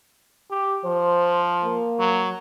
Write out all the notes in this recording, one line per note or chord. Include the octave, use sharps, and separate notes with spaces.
G4
F3 C5
A#3
F#3